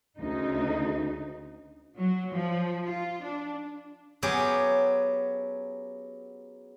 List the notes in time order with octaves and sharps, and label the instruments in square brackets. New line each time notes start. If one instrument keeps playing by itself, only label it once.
[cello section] D2 C#3 D#4
F#3
F3
F4
D4
[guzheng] F#3 B3 C#4 G4 G#4